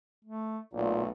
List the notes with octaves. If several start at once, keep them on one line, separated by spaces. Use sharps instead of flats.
A3
B1 A#2 A3